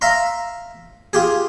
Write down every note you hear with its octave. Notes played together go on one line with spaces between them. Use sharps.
E5 F5 A#5 C6
F4 G4 G#4